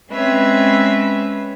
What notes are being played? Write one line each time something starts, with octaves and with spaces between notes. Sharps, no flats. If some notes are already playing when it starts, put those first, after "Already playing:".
G#3 C4 C#4 B4 C#5 E5